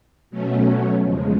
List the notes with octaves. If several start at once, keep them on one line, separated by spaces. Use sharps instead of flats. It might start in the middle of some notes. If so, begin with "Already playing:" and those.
B2 F#3 A3 C#4
E2 C#3 F3 G#3